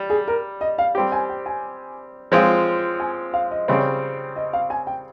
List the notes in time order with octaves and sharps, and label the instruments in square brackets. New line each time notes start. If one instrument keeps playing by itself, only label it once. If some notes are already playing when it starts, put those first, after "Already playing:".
Already playing: [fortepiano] G3
[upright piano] G#4
A#4
D#5
F5
[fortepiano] G3 C4 G4 [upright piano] G5
[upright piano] G#5
G5
G#5
[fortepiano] F3 G#3 C4 F4
[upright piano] G#5
F5
D#5
[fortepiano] C#3 G3 C4
[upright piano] D#5
F5
G#5
G5